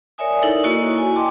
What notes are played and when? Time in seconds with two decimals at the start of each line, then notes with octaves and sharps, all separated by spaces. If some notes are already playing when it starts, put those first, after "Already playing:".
0.18 A#4 C#5 D5 E5 G#5 D#6
0.42 D#4 E4 A4 A#4 D5
0.63 A#3 E4 F#4 C#5 D#5 C#6
0.98 G#5
1.16 D#5 G5 A5 C6 D6